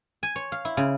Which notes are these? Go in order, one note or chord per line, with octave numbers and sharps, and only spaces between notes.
G#5
C#5
F5
E4
C#3